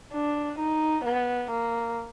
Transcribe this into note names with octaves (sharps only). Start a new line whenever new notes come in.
D4
D#4
B3
A#3